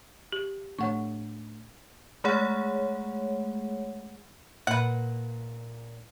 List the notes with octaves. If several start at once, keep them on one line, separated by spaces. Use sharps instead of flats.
G4
A2 A3 D4 C#5 F#5 C#6
G#3 A3 G#4 C#5 F#5
A#2 B4 F#5